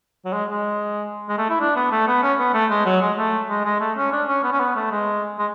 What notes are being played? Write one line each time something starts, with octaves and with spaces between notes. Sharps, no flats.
F#3
G#3
G#3
G#3
A3
E4
D4
B3
A3
B3
C#4
B3
A3
G#3
F#3
G#3
A3
G#3
G#3
A3
C#4
D4
C#4
B3
C#4
B3
A3
G#3
G#3